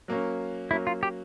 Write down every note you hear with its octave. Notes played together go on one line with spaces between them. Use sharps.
F#3 A#3 C#4
F#3 A#3 C#4 E4
F4
G4